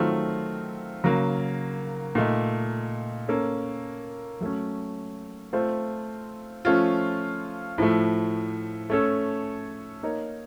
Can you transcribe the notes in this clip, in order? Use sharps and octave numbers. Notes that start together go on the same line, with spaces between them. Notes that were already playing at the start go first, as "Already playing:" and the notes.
Already playing: D#3 F#3 A3 C4 F4
C#3 F#3 A#3
A#2 A3 D#4
A#3 C#4 A4 C#5
F#3 A3 C#4
A3 C4 F4 C5
F3 A3 C#4 F4
A2 F3 A3
A3 C#4 A4 C#5
A#3 D#4 A#4 C#5